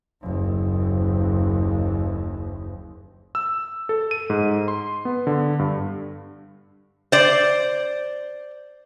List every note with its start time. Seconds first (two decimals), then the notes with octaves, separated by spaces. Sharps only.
0.22 F#1 D#2
3.35 E6
3.89 A4
4.11 D#7
4.30 G#2
4.68 C6
5.05 B3
5.27 D3
5.59 G2
7.12 C5 D5